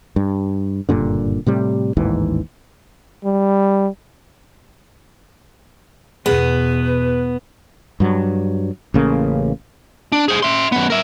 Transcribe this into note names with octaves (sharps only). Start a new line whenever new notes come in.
G2
F#1 G2 A#2 D3
A2 C3 G3
A1 D#2 G#2 E3
G3
E2 B2 B3 G#4 B4
G2 F#3
A1 C#3 A#3
D4
G#4 C5
E5 C6
F#2 B3
A#4 E5